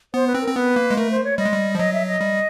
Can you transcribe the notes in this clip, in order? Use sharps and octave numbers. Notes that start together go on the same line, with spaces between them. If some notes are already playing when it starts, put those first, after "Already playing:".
B3 C5
B4
C4
A#4
C4
B3 B4
A#3
G#3
A3 A#4
C5
C#5
G3 D#5
G#3
G3
F3
F#3 D#5
E5
D#5
G3